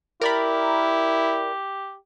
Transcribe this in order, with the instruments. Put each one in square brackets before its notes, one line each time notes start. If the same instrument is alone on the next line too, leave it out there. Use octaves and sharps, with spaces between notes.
[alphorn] E4 [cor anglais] G4 [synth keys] A#4 D5 B5